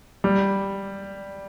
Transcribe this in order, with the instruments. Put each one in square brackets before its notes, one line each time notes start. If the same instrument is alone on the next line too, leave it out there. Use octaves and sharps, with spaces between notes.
[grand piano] G3